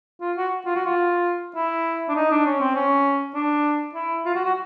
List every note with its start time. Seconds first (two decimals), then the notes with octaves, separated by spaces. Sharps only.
0.21 F4
0.37 F#4
0.66 F4
0.75 F#4
0.86 F4
1.56 E4
2.09 D4
2.15 D#4
2.31 D4
2.46 C#4
2.60 C4
2.75 C#4
3.35 D4
3.95 E4
4.25 F4
4.35 F#4
4.45 F#4